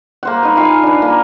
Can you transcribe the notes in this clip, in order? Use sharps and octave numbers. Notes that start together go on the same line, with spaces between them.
A#3 C5 F#5
D#4 B4
D#4 F4 F5 G#5
D4 B4
A#3